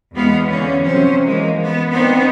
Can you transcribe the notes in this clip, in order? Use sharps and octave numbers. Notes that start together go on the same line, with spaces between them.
E2 G#3 B3 F5
D3 E3 C#4
C3 F3 F#3 C#4 C5
E3 G#3 A#3
B3
B3 C4 D4 D#4